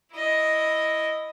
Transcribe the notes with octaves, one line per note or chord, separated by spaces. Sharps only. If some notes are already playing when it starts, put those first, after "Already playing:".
E4 D#5